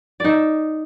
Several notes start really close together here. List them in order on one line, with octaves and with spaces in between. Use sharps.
D5 D#4 E5